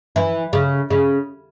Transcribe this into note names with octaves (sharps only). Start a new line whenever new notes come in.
E3
C#3
C#3